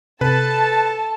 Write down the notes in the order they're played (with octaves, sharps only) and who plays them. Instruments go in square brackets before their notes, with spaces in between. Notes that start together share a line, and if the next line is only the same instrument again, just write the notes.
[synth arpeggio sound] C3 [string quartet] A4 [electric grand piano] B4 [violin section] A5